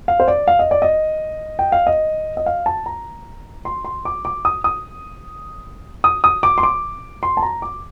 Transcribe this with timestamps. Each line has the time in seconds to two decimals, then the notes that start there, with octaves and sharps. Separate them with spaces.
0.08 F5
0.20 C5
0.28 D5
0.48 F5
0.59 D#5
0.71 D5
0.82 D#5
1.59 G5
1.72 F5
1.87 D#5
2.37 D#5
2.46 F5
2.66 A5
2.86 A#5
3.65 C6
3.85 C6
4.05 D6
4.25 D6
4.45 D#6
4.64 D#6
6.04 D#6
6.24 D#6
6.43 D6
6.58 C6
6.63 D6
7.23 C6
7.37 A5
7.43 A#5
7.62 D6